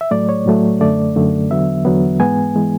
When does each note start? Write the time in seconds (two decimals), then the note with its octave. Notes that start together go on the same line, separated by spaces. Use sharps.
0.01 E5
0.11 A2 F#3 A3 D5
0.29 C#5
0.46 A2 F#3 A3
0.81 F#2 D3 A3 D5
1.16 F#2 D3 A3
1.50 E2 D3 F#3 B3 E5
1.85 E2 D3 F#3 B3
2.20 G#2 E3 G#3 B3 G#5
2.56 E3 G#3 B3